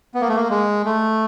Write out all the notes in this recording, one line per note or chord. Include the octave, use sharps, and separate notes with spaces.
B3
A#3
A3
A#3
G#3
A3